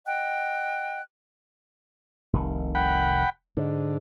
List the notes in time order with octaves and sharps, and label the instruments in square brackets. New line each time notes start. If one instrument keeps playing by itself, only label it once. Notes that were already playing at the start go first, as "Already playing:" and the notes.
[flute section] D#5 F#5 G5 F#6
[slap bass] F1 C2 D#3
[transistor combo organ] F#5 G5 B5
[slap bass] G#2 [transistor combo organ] D3